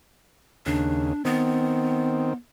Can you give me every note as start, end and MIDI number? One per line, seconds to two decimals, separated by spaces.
0.66 1.13 39
0.66 1.13 49
0.66 1.22 62
1.25 2.33 51
1.25 2.35 59
1.25 2.33 60